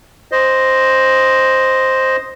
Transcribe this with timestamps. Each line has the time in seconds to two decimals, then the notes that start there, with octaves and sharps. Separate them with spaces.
0.32 C5 D#5